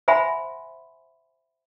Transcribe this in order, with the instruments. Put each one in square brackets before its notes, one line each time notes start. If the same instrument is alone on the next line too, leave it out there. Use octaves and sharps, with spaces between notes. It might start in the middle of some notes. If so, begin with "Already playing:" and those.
[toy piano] C5 E5 F#5 G#5 B5 C6